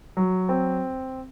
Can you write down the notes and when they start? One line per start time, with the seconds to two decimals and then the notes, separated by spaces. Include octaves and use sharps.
0.17 F#3
0.49 C4